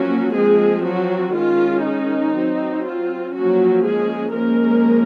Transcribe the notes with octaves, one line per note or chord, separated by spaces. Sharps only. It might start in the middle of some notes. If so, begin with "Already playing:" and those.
Already playing: F3 F#3 A#3 C#4 F#4
F3 G#3 C4 G#4
F#3 F#4
D#3 G#3 C#4 F4
D#4
F#3 C4
F4
F3 F#3 A#3 C#4 F#4
G#3 G#4
F3 G#3 A#3 C#4 A#4